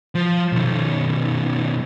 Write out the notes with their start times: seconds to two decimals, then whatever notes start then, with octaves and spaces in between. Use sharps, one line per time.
0.15 F3
0.52 B1 D#3